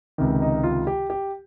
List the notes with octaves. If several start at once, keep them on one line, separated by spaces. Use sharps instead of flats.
C#2 C3 D#3
D#4
F4
G4
G4